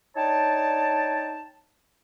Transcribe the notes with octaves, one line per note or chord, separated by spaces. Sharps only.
D4 D#4 C#5 G5 A5